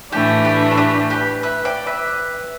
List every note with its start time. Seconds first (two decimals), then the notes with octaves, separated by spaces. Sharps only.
0.12 A2 E3 A3 D4 G4
0.45 G4 B4
0.71 A4
0.77 G4 B4
1.10 G4 B4
1.43 B4 E5
1.65 D5 G5
1.87 B4 E5